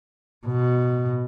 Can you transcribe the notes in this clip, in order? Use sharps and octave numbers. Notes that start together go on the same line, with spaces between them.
B2